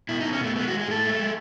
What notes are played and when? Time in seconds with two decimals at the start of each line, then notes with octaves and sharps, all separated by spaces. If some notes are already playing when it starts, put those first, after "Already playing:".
0.09 B2 E4
0.20 D#4
0.24 B2
0.33 C#4
0.41 B2 A3
0.56 G#3 B3
0.68 F#4
0.72 G#3
0.79 G#4
0.87 A2 A4
1.04 G#3
1.19 G#3